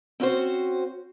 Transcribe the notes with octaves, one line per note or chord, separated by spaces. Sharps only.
C4 C#4 F#4 C5